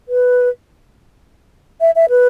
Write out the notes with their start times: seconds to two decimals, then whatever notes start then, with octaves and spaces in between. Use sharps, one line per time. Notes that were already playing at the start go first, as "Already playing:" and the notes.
0.09 B4
1.81 E5
1.96 E5
2.10 B4